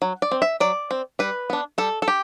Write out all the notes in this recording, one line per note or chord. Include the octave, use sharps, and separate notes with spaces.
F#3
D5
C4
E5
F#3 D5
C4
G3 B4
B3 D4
G3 A4
A4
G4